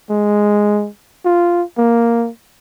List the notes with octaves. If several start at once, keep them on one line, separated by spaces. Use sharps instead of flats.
G#3
F4
A#3